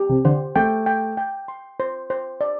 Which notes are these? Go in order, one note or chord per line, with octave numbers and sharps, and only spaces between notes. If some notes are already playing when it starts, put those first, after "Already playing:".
Already playing: G4
C3
D3 C5
A3 G5
G5
G5
C6
C5
C5
D5